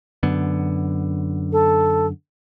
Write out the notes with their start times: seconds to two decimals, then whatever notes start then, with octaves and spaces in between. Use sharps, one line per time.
0.23 F#2 D3 B3
1.52 A4